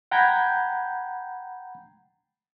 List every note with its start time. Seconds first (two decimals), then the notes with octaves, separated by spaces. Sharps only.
0.11 F#5 G5 A#5 B5 G6 G#6